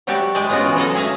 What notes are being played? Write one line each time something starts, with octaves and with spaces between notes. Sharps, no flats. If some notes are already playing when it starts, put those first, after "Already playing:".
F#3 G3 F#4 G4 E5 A5
G#3 B4 D5 E5 G5
G#3 B3 C#4 F4 F#4
E3 F4
F#3 G#4 A4 A#5
G#4 E5 F5 A#5